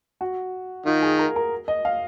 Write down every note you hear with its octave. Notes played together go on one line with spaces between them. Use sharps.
F#4
D#3 F4
G#4
A#4
A#4
D#5
F5